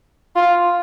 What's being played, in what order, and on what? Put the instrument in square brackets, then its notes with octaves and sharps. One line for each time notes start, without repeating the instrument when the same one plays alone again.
[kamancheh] F4